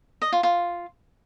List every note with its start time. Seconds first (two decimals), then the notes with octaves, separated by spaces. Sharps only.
0.22 D#5
0.32 F4
0.43 F4